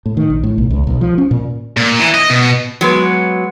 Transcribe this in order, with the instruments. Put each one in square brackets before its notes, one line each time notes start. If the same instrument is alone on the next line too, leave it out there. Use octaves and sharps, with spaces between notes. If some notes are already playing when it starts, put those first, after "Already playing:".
[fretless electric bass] A2
D#3
A#1
A2
B1
C#2
B1
F3
C#4
A#2
[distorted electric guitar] A#2
E3
D#5
B2
[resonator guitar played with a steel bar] F#3 G#3 B3